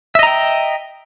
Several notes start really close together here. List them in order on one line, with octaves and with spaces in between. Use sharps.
E5 D#5 A#5 G5